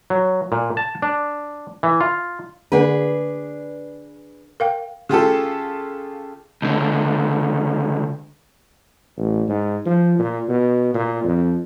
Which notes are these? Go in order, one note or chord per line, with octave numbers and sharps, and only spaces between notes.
F#3
A#2
A5
D4
E3
F4
D3 A#3 D4 G#4 B4 F#5
A#4 F5 G5
C#3 F4 G4 A4
C#2 D3
A1
G#2
F3
A#2
B2
A#2
F2